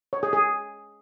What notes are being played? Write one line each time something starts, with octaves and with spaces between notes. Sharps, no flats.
C#5
G#4
G#4